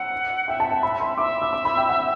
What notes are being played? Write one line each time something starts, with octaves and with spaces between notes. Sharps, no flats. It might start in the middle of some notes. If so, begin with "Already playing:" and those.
Already playing: F#5 E6
E5 G5
A5
G5
B5
C6
E5 D6
E6
D6
B5
G5
F#5